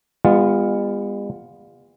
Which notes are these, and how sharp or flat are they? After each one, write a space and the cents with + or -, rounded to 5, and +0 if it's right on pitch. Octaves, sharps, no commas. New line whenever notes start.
G#3 -45 B3 +0 F4 +0